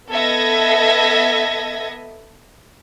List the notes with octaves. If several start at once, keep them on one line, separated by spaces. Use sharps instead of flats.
B3 A4 D#5 E5 G#6 A#6